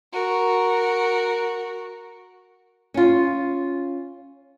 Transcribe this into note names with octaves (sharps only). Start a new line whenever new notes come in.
F#4 A#4
C#4 F4